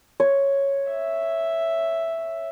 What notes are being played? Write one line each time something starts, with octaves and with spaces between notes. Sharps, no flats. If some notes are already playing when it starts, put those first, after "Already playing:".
C#5
E5